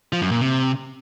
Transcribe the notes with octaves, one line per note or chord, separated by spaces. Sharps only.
F3
F#2
A#2
C3